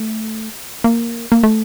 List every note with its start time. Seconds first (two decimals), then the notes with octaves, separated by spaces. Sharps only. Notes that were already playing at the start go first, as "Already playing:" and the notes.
Already playing: A3
0.84 A#3
1.32 A#3
1.43 A3